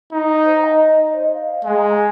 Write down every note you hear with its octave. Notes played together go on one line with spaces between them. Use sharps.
D#4
C5
A#5
D#5
D#5
C5
D#5
F5
G#3 G#5
A#5
G#5